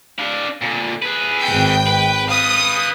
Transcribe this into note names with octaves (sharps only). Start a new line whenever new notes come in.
D4 F5
A#2 D3
G#4 B4
G#1 G5
B4
B4 F5 D#6